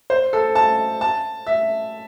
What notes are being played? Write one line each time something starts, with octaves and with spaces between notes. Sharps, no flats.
C5
A4
A5
A5
E5